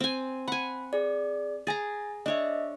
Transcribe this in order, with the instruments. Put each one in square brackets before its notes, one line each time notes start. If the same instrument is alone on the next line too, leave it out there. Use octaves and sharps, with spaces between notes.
[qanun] C4 G#5
[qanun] F#5 G#5 [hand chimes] B5
[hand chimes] G#4 D5
[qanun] G#4 A#5 [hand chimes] G#5 A6
[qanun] D4 C#5 [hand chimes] D#5 E5